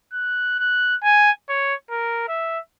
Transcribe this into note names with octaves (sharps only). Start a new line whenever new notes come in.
F#6
F#6
G#5
C#5
A#4
E5